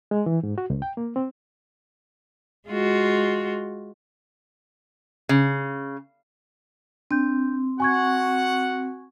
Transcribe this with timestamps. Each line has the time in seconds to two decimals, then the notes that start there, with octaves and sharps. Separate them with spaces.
0.11 G#3
0.26 E3
0.43 G#2
0.58 F#4
0.70 C#2
0.82 G5
0.97 A#3
1.16 C4
2.68 G#3 F4 F#4
5.29 C#3
7.11 C4 D4 G6
7.80 F#4 F#5 G#5 C#6 G#6